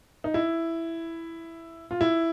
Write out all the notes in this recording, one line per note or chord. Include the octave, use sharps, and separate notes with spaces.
D#4
E4
F4
E4